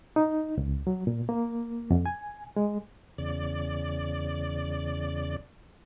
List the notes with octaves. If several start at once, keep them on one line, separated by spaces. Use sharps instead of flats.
D#4
C#2
F#3
A#2
A#3
F2
G#5
G#3
E2 C#3 D5